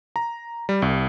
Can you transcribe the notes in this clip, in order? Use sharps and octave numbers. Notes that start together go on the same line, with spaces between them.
A#5
G3
C2